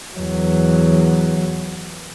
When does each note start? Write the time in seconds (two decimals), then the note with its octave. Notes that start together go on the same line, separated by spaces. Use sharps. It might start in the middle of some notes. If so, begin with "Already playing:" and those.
0.15 E2 F#3